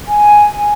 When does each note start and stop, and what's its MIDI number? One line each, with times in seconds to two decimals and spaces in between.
0.09 0.72 80